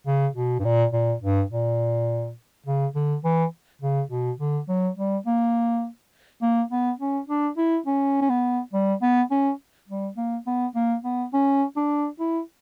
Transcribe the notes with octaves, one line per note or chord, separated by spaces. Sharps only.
C#3
B2
G2
A#2
A#2
G2
A#2
C#3
D3
E3
C#3
B2
D3
F#3
G3
A#3
A#3
B3
C#4
D4
E4
C#4
C#4
B3
G3
B3
C#4
G3
A#3
B3
A#3
B3
C#4
D4
E4